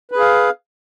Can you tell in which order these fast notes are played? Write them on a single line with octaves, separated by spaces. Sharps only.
B4 G#4 F5